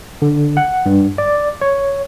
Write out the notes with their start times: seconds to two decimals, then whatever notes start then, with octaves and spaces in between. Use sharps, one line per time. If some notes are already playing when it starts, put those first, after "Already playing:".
0.22 D3
0.57 F#5
0.86 G2
1.18 D5
1.61 C#5